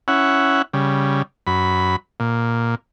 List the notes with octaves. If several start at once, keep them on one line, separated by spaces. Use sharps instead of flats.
C#4 E4 F#5
C#3 G3
F#2 B5
A#2